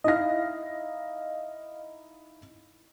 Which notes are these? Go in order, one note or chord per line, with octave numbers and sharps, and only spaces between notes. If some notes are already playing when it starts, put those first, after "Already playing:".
D#4 E4 D#5 F5 A#6